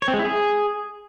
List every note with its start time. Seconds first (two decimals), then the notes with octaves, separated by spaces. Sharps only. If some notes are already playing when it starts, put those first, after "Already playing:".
0.02 C#5
0.08 C4
0.14 G#3
0.19 E4
0.25 G#4